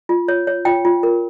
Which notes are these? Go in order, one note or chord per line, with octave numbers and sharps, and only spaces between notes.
F4
C#5
C#5
F4 G5
F4
A#4